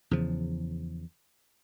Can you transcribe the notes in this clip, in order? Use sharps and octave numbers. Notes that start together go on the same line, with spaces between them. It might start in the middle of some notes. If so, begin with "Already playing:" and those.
E2 C#3 F3